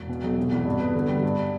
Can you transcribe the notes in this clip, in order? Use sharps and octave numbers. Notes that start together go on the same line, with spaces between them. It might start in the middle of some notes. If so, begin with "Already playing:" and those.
Already playing: E1
B2
B1
C3
E2
G2
B3
D3
G3
G2